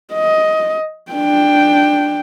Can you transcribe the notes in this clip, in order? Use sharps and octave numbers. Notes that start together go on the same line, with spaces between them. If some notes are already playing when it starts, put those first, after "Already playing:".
D#5
D4 G5